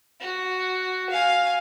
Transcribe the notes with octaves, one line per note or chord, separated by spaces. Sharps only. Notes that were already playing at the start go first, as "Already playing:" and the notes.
F#4
F5 G#5